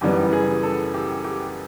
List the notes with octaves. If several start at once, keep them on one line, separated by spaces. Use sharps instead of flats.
F#2 C#3 E3 G3 B3 G4
G#4
A4
G4
G4